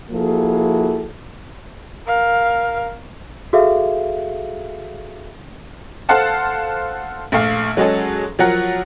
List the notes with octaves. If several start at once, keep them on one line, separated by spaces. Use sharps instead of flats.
F3 A#3 E4 F#4 G#4 A4
A#4 F5
F#4 G#4 A4 E5 F5
A4 C5 F5 F#5 A5
A#1 A3 F5
F#3 G#3 C#4 G#4 A4
F3 F#3 A#4 F#5